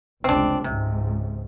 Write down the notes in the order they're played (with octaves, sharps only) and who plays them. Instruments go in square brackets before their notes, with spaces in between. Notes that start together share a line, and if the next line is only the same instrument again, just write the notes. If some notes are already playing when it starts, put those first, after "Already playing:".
[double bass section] F1 C#2 [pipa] C4 D4
[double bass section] C#2 G#2 [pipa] C3